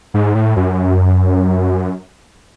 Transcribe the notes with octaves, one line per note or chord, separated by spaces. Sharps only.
G#2
A2
F#2